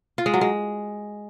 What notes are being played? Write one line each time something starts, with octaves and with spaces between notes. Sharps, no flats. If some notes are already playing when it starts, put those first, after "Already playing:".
F4
G#3
F#3
G#3